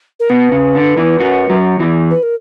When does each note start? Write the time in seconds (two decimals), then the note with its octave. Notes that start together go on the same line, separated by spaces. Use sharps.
0.19 A#4
0.29 B2 B4
0.52 C#3
0.75 D3
0.97 E2 E3
1.19 F#2 F#3
1.50 F#2 F#3
1.79 E2 E3
2.10 B4
2.22 A#4